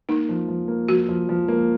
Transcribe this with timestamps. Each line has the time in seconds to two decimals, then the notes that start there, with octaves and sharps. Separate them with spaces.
0.09 A#3 D#4
0.29 F3
0.48 F3
0.68 A#3
0.88 F3 F#4
1.09 F3
1.29 F3
1.48 A#3